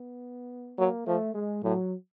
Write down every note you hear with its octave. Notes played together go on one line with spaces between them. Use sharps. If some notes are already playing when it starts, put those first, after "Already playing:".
Already playing: B3
F#3 A#3
F3 A3
G#3
A2 F#3